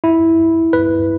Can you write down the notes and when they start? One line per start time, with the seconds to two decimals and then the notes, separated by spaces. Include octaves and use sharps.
0.04 E4
0.73 B4